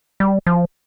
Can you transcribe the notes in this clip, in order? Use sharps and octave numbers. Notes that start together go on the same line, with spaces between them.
G3
F3